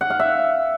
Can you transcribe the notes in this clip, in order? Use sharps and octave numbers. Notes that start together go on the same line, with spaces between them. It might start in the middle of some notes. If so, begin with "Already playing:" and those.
F#5
F5
E5